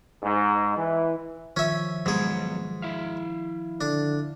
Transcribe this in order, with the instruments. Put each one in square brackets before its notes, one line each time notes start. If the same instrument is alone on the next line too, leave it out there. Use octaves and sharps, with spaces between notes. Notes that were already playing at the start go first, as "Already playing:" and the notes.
[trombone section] G#2
E3
[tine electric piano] D#3 F3 [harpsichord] C#4 E5
[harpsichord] G#2 G#4 [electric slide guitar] F#3 B3
[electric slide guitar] E4 E5 F5
[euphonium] D3 [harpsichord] D4